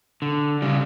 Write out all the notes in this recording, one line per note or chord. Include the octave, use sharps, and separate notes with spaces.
D3
C#3 G3